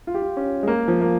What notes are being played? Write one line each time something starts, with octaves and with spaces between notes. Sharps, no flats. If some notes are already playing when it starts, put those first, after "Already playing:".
F4
G4
F4
C#4
G#3
A#3
F3
A#3